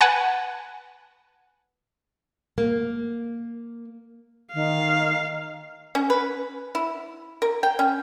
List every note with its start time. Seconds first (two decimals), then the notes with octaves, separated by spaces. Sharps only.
0.01 B4 F#5 G#5 A5
2.58 A#3
4.54 D#3 F5
5.95 C#4
6.10 B4
6.75 E4
7.42 A#4
7.63 G5
7.79 C#4